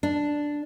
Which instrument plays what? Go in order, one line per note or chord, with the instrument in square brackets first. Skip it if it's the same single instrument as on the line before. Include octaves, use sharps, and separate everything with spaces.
[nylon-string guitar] D4